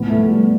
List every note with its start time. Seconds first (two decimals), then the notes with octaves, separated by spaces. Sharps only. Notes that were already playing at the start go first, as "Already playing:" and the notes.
Already playing: A2 F3 B3
0.10 A3
0.29 G3